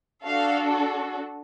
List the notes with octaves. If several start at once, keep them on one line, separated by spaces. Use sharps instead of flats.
D4 F#4 A4 F5